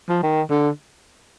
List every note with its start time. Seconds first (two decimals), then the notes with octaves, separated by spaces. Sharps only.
0.09 F3
0.23 D#3
0.50 D3